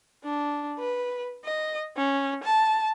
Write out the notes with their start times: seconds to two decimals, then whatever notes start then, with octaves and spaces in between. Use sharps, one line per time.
0.24 D4
0.79 B4
1.44 D#5
1.97 C#4
2.43 A5